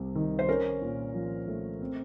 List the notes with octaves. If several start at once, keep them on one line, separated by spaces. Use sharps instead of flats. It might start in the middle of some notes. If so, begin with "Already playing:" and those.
Already playing: C2 C3
D#3
C5
C#4 A#4
A#2
F3
A3
C4